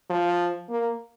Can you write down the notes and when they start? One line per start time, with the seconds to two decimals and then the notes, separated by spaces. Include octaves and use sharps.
0.10 F3
0.70 A#3